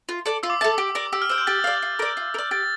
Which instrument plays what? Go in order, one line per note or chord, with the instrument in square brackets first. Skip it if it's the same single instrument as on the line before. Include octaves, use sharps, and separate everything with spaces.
[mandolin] F4
A4 D5
[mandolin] F4 [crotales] E6
[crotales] D6
[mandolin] A4 E5 A5 [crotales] D6
[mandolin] G4
A#4 D5
[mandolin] G4 [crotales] E6
[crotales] F6
[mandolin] C5 G5 [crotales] E6
[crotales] G6
[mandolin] G4 [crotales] A6
[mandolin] D5 F5
F4
A#4 D5
F4
A#4
D5
[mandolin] G4 [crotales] A6